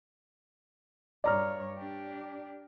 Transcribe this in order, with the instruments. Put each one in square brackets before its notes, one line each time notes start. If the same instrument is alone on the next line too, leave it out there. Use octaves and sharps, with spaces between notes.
[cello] G2 C#5 [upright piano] D5 A#5 F6
[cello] D4 G4